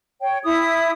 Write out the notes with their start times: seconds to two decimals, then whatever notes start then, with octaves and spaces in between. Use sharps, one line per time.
0.21 C#5 G5
0.44 E4 D#6